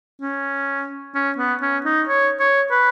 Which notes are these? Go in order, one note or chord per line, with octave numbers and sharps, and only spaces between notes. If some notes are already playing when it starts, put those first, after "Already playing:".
C#4
C#4
B3
C#4
D#4
C#5
C#5
B4